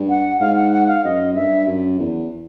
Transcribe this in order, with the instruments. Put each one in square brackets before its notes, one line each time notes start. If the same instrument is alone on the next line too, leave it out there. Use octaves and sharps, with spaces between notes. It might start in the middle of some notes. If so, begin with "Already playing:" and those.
Already playing: [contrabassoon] G2
[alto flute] F#5
[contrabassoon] G#2 [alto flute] F5
[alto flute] F#5
F#5
F5
[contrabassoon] F#2 [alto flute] D#5
[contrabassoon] G2 [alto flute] E5
[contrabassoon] F#2
E2